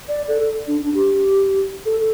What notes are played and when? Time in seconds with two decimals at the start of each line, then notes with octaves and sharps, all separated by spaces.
0.08 D5
0.28 A4
0.67 D4
0.81 D4
0.94 G4
1.86 A4